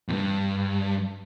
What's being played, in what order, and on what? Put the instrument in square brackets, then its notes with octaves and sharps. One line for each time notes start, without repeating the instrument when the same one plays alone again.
[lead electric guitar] E2 G2